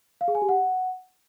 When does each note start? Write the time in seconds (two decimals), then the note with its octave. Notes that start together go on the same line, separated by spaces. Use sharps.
0.21 F5
0.28 G#4
0.35 G#5
0.42 G4
0.49 F#5